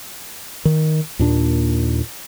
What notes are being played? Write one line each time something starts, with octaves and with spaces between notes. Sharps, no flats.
D#3
D#2 A#2 D4